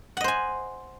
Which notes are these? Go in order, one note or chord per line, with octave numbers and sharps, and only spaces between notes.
C5 D#5 F#5 G#5